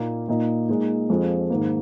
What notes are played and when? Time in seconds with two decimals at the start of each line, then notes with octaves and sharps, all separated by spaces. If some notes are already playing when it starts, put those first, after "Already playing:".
Already playing: A#2 A#3 D#4
0.28 A#2 A#3 D#4
0.69 A#2 G#3 D#4
1.09 F2 F3 G#3
1.50 G#2 D#3 A#3